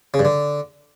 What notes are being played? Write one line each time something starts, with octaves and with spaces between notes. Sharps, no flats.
C#3
G2
D3